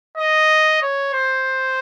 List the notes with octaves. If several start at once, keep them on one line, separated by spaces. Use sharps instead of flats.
D#5
C#5
C5